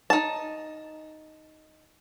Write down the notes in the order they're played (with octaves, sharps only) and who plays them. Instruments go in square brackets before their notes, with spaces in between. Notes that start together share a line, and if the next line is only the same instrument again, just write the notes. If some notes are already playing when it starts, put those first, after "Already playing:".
[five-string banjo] D#4 A5